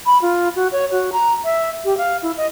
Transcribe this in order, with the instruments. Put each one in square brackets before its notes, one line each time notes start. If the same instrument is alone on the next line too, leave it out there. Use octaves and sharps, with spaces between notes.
[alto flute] B5
F4
F#4
C#5
F#4
A#5
E5
G4
F5
E4
D#5